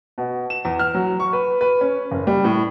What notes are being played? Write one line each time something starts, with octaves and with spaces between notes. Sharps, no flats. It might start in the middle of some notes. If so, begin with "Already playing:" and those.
B2
E7
E2
F6
F#3
C#6
B4
B4
C#4
F#1
G3
A2